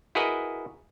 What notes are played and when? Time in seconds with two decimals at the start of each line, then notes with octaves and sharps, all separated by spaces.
0.15 E4 F#4 G#4 A#4 B4 D#5